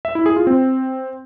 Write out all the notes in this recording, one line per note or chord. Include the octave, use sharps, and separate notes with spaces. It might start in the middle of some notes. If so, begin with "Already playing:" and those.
E5
E4
G#4
F4
C4